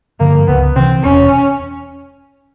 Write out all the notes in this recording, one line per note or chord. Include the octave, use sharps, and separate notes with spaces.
G2 D3 F3 A#3
C#2 B3
C3 E3 C4
E1 C#4